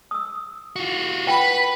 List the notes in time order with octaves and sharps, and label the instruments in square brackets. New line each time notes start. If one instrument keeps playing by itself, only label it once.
[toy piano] D#6 E6
[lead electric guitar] F4 F#4
[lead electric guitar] B4 [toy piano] F#5 G5 [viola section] B5